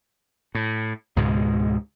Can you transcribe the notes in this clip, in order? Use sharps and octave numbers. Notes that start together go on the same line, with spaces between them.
A2
C#2 G#2 B2 G#3